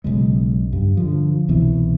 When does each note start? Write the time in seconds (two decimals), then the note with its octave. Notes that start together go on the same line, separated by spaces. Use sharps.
0.04 B1 C#3 G#3
0.73 G2
0.97 D3 F3
1.48 C2 B2 E3